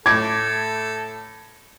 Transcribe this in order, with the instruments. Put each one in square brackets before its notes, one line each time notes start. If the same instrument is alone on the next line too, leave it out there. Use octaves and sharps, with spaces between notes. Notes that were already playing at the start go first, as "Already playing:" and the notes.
[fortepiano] A2 D6 [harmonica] A4 [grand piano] G#6